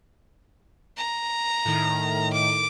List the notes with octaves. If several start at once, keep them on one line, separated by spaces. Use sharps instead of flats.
A#5
A2 D#3
D6